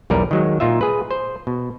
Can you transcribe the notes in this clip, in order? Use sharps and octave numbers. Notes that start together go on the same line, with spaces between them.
B1 E2 G3 A#4 B4
D#3 F#3 G#3
A#2 D#4 F4 E5
G#4 B4
C5
B2